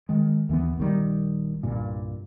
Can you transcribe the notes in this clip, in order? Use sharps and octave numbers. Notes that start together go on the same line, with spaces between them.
D#3 G#3
D#2 E3 A#3 B3
A#1 D#3 G3
C2 G2 A#2